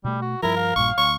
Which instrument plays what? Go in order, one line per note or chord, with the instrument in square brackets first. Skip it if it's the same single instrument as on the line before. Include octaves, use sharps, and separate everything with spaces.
[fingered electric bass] B2 A3 [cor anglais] G3
[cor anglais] F#4
[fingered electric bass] G2 F3 [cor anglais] E4 [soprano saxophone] A#4
[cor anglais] F5
[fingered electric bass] A#1 G2 A#2 [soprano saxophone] C#6
[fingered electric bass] D2 [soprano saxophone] C#6